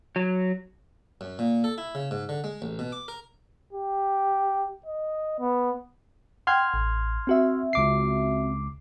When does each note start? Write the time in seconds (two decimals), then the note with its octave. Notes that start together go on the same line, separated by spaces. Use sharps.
0.16 F#3
1.21 F#2
1.39 A#2
1.64 A4
1.78 E4
1.95 C#3
2.11 G#2
2.29 D3
2.44 G#3
2.62 A1
2.79 B2
2.92 D6
3.08 A#4
3.73 G4
4.86 D#5
5.40 B3
6.47 F#5 G5 C6 F6 G#6
6.74 A1
7.27 C4 F#4 E5
7.73 C#2 D6 C7